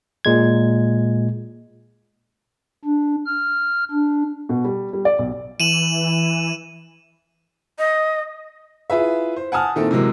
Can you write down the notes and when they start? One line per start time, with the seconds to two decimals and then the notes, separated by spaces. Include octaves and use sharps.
0.25 A#2 G#3 G#6
2.85 D4
3.26 F6
3.92 D4
4.49 B2
4.65 G3
4.93 G3
5.05 D5
5.19 B1
5.60 E3 D#7 E7 F#7
7.78 D#5
8.90 E4 F4 G#4 B4 E5
9.36 C5
9.52 F#5 G#5 A5 D#6 F6
9.76 A#2 D#3 C4 E4 A4
9.91 C3 E3 F#3 G#3 A#3